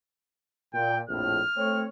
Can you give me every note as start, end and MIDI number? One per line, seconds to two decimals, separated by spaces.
0.74 1.01 46
0.74 0.99 79
1.09 1.40 34
1.09 1.40 41
1.09 1.40 45
1.09 1.89 89
1.57 1.84 57
1.57 1.84 60
1.57 1.84 73